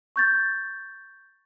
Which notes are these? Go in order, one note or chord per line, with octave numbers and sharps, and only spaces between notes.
C#6 G6 A6